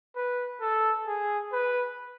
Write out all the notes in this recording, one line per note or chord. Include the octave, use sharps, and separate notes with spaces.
B4
A4
G#4
B4